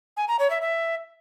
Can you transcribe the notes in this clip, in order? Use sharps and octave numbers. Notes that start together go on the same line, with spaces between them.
G#5
A#5
C#5
E5
E5